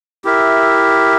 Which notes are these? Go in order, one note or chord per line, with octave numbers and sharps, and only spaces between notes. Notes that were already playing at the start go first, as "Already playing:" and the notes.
E4 G4 A#4 E5